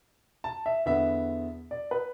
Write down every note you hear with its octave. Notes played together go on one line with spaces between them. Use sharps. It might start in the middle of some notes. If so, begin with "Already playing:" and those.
A5
E5
E2 D3 B3 E5
D5
B4